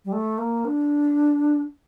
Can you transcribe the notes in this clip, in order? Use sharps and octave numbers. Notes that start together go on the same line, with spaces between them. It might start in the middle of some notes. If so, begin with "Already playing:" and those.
G3
A3
A#3
D4